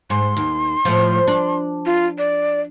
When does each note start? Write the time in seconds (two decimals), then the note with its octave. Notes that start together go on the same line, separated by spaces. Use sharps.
0.10 G#2 C6
0.37 D#2
0.85 A2 F3
1.28 D4
1.86 F4
2.18 D5